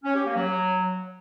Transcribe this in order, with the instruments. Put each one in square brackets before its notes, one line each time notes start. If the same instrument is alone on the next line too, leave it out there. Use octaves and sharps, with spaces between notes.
[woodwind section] C#4
G4
A#3
F#3